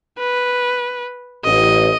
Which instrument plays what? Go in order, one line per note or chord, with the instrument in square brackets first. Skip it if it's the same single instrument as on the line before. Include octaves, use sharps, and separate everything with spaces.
[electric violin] B4
[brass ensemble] A1 [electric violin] D#5